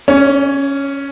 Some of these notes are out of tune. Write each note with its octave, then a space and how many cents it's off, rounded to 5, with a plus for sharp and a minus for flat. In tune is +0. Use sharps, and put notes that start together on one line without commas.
C#4 +0 C#5 +45